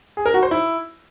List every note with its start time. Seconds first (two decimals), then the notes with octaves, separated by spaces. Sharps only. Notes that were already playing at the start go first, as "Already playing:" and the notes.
0.17 G#4
0.26 A#4
0.34 F#4
0.43 C5
0.51 E4